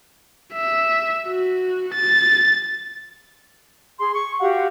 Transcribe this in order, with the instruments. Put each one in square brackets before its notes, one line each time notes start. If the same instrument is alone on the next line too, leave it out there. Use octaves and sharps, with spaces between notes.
[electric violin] E5
F#4
A6
[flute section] G#4 C6
C#6
F#4 G4 F5 F#5